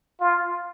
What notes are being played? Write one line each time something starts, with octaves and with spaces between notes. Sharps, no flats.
F4